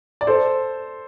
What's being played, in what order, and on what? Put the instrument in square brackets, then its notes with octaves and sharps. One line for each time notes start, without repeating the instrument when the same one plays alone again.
[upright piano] D5
A4 C5